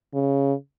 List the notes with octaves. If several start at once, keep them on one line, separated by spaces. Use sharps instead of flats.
C#3